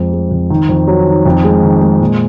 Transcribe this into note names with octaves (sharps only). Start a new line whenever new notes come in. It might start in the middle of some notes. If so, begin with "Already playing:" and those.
Already playing: F2 G#3
G#3
F2
D#3
F2
F#3
D#3
F2
G#3
D#3
G#3
A#2